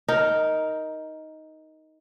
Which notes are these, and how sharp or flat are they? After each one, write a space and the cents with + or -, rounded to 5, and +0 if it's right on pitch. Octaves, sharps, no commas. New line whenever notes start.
D#4 +10 A#4 +0